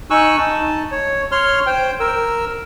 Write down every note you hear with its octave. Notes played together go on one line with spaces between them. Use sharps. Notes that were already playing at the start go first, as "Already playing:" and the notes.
D#4 G#5 C#6 E6 F#6
D#4 A5
C#5
C#5 C6 F6
C5 G5
A#4 E6